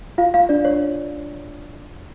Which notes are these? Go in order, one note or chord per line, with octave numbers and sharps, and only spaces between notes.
F4 F5
F4 F5
D4 D5
C#5